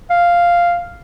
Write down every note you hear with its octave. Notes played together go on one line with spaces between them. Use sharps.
F5